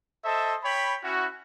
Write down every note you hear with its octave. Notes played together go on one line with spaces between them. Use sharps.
A4 C5 D#5 E5 A5
C#5 G5 B5
C#4 E4 F#4